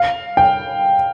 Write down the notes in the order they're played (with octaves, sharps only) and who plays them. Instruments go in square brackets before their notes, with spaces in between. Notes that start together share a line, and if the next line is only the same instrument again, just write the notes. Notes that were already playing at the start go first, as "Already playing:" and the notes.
Already playing: [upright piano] F5
G5